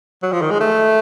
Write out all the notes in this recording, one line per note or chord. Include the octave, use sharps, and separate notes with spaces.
F#3
F3
D#3
G#3
A3